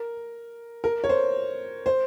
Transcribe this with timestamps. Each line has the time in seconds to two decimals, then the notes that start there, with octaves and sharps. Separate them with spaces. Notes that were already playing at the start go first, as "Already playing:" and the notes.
Already playing: A#4
0.84 A#4
1.04 C#5
1.09 C5
1.86 C5